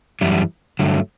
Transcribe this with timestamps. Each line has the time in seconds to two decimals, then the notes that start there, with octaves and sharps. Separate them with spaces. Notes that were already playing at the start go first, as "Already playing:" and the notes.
0.21 F#2 E3 G3 E4
0.79 G2 D3 F#3 A3